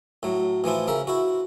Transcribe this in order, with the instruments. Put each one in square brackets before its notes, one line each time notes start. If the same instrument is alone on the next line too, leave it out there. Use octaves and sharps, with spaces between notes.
[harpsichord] A2 F#3
A2 E3 F3 E4
C#3 A#4 E5
E4 F#4